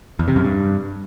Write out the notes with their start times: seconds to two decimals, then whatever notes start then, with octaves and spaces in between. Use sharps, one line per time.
0.19 E2
0.28 C3
0.36 F#2
0.44 G2